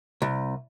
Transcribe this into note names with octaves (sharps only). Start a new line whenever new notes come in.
C2